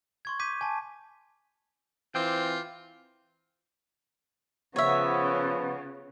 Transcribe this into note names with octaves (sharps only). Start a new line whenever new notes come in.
C6 C#6 G#6
D6 G6 B6 D#7
G#5 A5
E3 C4 F4 G5 D6
C#3 F3 B3 C#5 E5